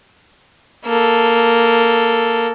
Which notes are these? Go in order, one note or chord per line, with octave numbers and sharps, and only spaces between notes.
A#3 A4